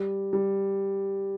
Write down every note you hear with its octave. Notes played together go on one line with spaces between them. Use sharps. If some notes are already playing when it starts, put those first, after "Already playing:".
Already playing: G3
G3